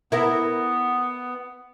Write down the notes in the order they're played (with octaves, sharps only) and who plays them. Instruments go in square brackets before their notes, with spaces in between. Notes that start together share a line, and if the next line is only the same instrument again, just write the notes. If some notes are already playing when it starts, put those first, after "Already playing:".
[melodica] B3 [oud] E4 A#4